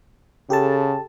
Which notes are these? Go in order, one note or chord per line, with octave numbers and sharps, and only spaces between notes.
C#3 G4 A4 A5